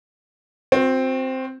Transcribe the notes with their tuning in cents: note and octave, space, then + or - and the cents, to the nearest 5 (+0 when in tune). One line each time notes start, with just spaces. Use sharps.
C4 +0 F#4 -40